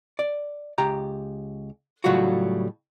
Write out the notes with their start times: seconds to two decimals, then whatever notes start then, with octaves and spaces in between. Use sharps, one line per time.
0.19 D5
0.78 C#2 G4 A#5
2.04 A2 C#3 F#3 G3 F4 F#4